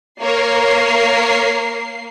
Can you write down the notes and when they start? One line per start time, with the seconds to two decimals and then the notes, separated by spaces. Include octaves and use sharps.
0.19 A#3 A#4 C#5 C7